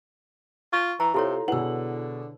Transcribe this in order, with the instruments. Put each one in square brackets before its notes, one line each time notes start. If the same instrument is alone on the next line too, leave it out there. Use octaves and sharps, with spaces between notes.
[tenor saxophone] F4 [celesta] C#6
[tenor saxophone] E3 [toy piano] A#5
[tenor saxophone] C3 [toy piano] E4 A4 C#5 [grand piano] F4 A#5 C6 [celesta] G4
[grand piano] B2 G#4 F#7 [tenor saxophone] D3 [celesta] E4 F#5 [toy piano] B4 E6